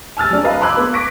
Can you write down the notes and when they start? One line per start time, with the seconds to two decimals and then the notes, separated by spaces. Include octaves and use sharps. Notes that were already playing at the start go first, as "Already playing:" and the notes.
0.17 G#5 E6 F6 A6
0.30 F#3 D4
0.44 B4 D#5 F5 A#5
0.61 B5 C6 D6 E6 F#6 G#6
0.77 B3
0.93 C#6 D6 A#6 B6 D7